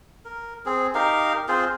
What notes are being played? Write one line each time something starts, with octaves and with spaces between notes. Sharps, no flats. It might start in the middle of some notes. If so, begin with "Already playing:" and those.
A#4
C4 G#4
D#4 G4 A#4 F5
C4 F4 G#4 C5